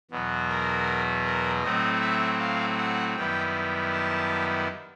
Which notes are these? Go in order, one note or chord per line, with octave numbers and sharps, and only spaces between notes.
E2 B2 F#3 B3
A#4
A#4
A2 F#3 A3 C4 D#5
E5
F5
F#5
F#2 D#3 G3 B3 E4 G5
A5